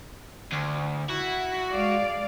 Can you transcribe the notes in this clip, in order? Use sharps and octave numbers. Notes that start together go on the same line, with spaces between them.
D2
E4 F#4
G#3 D5 F5